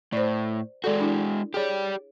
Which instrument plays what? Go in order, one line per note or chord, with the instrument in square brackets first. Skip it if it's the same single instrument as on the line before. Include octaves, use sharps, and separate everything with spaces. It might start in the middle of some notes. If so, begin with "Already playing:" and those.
[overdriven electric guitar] A2 [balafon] C5 D5
[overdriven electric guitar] G#3 F#4 [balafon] A4 D5
[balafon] D4 E4
[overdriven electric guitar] G4 D5 [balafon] G#4 C#5